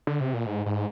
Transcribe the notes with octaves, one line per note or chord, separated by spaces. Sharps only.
D3
C3
A#2
G#2
G#2